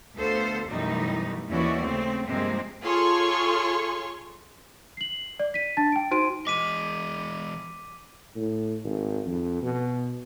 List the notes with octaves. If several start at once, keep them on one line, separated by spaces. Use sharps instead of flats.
D2 B3 A4 C5 F5
F#2 B2 E3 G3 A3 D#4
D#2 E3 C#4 E4 F#4 D5
C#3 A3 C4
G2 C3 F3 G#3 A#3 C4
F4 G#4 A4 C#5 C6 C#6
C7 F#7
D5
B6 D#7
D4 A5 A6
G5 D7
D#4 F#4 C5 C6 D7 D#7
E3 G#3 D#5 D6 B6 D#7
A2
G#1
F2
B2